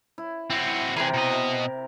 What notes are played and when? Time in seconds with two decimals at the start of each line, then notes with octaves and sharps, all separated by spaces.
0.18 E4
0.50 C4 E4 F#4
0.96 C3 E3 G#4 A#4
1.14 B2 D#5